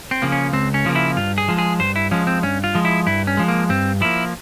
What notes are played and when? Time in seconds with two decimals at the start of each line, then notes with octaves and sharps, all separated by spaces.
0.11 C4
0.22 C#3 F3 A#3
0.32 C#4
0.53 C#2 C4
0.74 C#4
0.85 C#3 F3 A#3
0.96 E4
1.17 G2 F4
1.38 G#4
1.48 F3 G#3
1.58 G#4
1.79 G2 C5
1.96 E4
2.11 F3 G#3 C#4
2.27 C4
2.43 G2 C#4
2.64 F4
2.75 F3 G#3
2.85 E4
3.06 G2 E4
3.27 C#4
3.37 F3 G#3
3.48 A#3
3.69 G2 C4
4.01 F3 A#3 E4